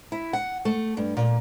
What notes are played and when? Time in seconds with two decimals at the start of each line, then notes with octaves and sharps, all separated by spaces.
0.12 E4
0.33 F#5
0.65 A3
0.97 G2
1.17 A#2